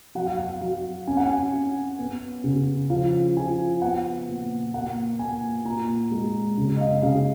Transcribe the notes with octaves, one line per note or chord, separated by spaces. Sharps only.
F#3 F#5
F5
F#5
F#3 F5
C#4 G#5
F#5
G#5
C#4
B3
C#3
F3 F5
F3 G#5
B3 F#5
A#2
A#3 F#5
A#3 G#5
A#2 A#5
G#3
C#3
D#5
F5
C#3 F5